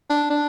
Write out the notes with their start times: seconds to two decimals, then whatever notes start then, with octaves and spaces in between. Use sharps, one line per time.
0.10 D4
0.30 D4